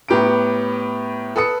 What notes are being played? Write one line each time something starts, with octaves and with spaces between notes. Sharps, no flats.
A2 B3 G4 B4 A#5 D7
A4 B4 D#6 C#7